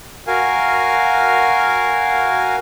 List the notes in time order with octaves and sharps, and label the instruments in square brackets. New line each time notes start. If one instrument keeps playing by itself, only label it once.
[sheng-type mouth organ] F#4 A#4 F5 G#5